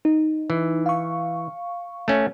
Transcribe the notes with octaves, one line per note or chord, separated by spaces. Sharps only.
D#4
E3
F5 C#6
A3 C#4